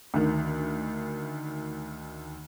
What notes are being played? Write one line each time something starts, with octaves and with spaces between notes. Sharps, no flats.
D2 D#3